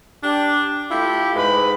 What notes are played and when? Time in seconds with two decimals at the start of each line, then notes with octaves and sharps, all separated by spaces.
0.23 D4 G4
0.90 A3 E4 F4 G4
1.35 G#2 G#3 B4 B5